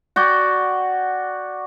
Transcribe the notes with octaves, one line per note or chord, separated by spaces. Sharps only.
F#4 D5 G5